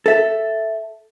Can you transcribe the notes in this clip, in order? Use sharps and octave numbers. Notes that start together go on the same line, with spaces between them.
A4 E5